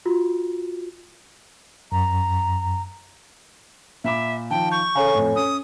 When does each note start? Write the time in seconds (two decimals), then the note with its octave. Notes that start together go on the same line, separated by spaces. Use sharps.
0.06 F4 F#4
1.92 F#2 A#5
4.04 A#2 E5 B5 D6
4.51 D#3 F3 G5 A5
4.71 C#6 G6
4.95 C#3 A4 C#5 F5 G#5 A#5
5.15 F2 A2
5.36 C#4 D#6